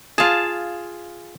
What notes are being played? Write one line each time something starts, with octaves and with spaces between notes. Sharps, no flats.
F4 G#4 F5 A5